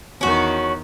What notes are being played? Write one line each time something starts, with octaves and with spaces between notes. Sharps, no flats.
E2 D#3 C#4 F#4